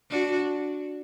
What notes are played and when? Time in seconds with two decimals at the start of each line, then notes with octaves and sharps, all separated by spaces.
0.10 D4 F#4